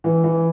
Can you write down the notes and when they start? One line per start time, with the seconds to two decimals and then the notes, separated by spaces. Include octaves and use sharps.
0.04 E3
0.24 E3